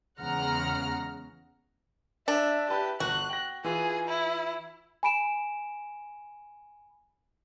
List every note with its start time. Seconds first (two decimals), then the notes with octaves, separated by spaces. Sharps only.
0.20 E2 C#3 G#3 F#5 A#5 F6
2.28 D4 E5
2.70 E4 G4 B4 A5
3.00 G1 F#4 F#6
3.29 G5 A#6
3.64 E3 F4 G#4
4.08 E4
5.03 G#5 B5 D7 E7